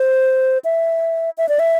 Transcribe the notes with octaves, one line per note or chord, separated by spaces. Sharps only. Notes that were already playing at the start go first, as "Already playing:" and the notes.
Already playing: C5
E5
E5
D5
E5